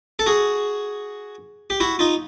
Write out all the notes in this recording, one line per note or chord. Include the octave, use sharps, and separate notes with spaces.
A4
F#4 G#4
G4
E4 F#4
D#4 F4